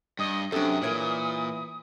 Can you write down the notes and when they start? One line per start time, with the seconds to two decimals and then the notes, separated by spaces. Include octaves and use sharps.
0.19 G2 D#5
0.52 F#2 C3 D4 A4 D#6
0.82 A#2 E3 A#4 C#5 D5